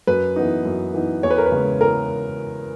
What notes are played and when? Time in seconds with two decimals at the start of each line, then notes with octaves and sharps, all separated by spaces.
0.07 F#2 B4
0.36 E3 B3 D#4
0.65 F#2
0.94 E3 B3 D#4
1.23 E2 C#5
1.30 B4
1.38 A#4
1.46 B4
1.52 C#3 G#3 C#4
1.81 E2 A#4